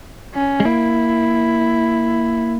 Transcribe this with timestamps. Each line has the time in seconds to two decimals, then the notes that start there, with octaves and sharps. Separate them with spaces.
0.35 C#4
0.60 G#3
0.65 A#3 E4